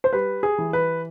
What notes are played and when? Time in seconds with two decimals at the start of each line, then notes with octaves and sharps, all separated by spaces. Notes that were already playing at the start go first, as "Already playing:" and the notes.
0.04 C5
0.13 G3 B4
0.43 G#4
0.58 E3
0.73 B4